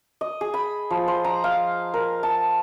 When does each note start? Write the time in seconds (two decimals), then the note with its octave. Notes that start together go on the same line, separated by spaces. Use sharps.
0.21 D#5
0.41 G#4
0.54 B5
0.90 F3
1.08 C5
1.24 A#5
1.44 F5
1.94 A#4
2.23 A5